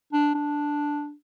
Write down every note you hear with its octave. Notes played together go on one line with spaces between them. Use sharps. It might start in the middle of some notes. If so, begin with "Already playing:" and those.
D4
D4